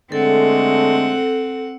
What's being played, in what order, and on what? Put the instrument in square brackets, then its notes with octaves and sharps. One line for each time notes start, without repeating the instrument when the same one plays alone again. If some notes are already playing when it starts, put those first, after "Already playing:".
[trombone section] D3 G#3 A3 [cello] C4 F#5 [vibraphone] A4